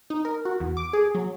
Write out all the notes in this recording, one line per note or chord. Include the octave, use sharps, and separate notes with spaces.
D#4
A#4
F#4
E2
D6
G#4
F#3